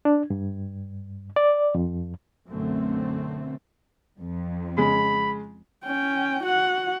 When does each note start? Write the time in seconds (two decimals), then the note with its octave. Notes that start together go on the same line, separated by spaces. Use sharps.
0.05 D4
0.30 G2
1.36 D5
1.75 F2
2.49 B1 F#2 D3 A3 C4
4.18 F2
4.78 C#3 G#3 B5
5.85 C#4 G5
6.43 F#4 F#5